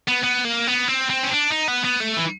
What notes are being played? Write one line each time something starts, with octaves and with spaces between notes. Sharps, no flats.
B3
B3
A#3
B3
C4
C4
C#4
D4
D#4
B3
B3
A3
E3